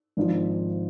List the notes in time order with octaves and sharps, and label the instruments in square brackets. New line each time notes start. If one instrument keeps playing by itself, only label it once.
[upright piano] G#1 G#2 F3